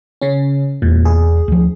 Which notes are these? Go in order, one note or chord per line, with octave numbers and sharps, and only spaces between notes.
C#3 C#4
E1 E2 A#2
G#4
D2 F3